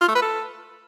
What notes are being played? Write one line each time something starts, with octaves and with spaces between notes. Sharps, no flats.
F4
A3
B4
A4